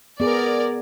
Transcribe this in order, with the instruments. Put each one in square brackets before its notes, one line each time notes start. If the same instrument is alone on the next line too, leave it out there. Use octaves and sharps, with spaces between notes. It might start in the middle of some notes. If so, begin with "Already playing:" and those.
[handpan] B3 G#4 [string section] A#4 D5